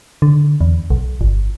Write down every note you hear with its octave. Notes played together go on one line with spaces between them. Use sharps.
D3
E2
B1
G1